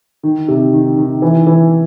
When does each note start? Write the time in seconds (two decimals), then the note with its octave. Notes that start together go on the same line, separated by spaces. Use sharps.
0.23 D#3
0.48 C3
0.73 D#3
0.97 D#3
1.22 E3
1.47 E3